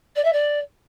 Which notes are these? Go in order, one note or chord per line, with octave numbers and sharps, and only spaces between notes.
D5
E5
D5